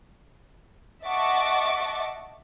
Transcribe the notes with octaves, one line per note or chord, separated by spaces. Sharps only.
D#5 E5 F#5 A5 C#6 D6